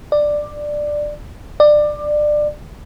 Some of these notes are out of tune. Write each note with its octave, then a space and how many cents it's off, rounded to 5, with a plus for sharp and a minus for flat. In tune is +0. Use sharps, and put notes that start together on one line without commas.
D5 +10
D5 +20